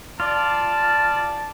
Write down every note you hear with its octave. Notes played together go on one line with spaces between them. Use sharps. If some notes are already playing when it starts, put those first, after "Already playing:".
F4 D5 A5